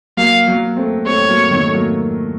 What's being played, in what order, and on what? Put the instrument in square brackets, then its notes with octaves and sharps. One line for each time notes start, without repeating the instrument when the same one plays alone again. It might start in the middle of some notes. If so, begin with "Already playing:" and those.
[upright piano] F#3 A#3 [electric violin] F5
[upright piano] F#3 A#3
A3 C4
[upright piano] A3 C4 [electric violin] C#5
[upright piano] F#3 A#3
D#3 F#3
A3
F#3 A#3